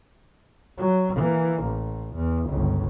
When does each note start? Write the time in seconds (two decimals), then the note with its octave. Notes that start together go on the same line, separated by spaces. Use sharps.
0.78 F#3
1.16 E3 A#3
1.63 A1
2.15 E2
2.49 G1 C#2